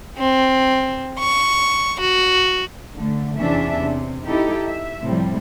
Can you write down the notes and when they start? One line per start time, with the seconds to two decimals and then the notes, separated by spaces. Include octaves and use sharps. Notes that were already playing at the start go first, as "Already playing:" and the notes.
0.18 C4
1.19 C#6
2.00 F#4
2.96 D3 A3
3.38 E2 C3 C#4 D4 E5
3.79 C3
4.27 D#4 E4 G4 A4
4.66 E5
5.03 A2 C3 F3 G3